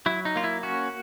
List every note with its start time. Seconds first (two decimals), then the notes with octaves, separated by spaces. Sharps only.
0.06 F#3 E4
0.25 D#4
0.36 A#3 F4
0.44 E4
0.63 C#4 F#4